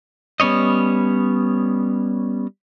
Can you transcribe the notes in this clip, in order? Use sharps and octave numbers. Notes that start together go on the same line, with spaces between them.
G3 B3 C#4 C#5 D#5